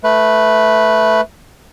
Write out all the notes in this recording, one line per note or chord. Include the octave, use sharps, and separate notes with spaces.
A3 B4